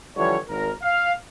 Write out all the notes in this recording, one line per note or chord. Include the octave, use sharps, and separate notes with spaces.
D3 E3 F3 G3 C#5
G#1 A#4
F5